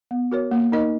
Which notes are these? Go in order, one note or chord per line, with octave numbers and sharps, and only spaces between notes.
B3
F#4 A#4 C#5
A#3
D#4 A#4 D#5